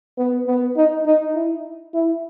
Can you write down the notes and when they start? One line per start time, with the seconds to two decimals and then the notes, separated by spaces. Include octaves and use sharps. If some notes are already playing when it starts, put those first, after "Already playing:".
0.18 B3
0.46 B3
0.76 D#4
1.06 D#4
1.35 E4
1.94 E4